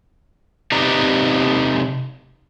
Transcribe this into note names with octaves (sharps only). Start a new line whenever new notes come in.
C3 D#4 G4 B4 D5 A#5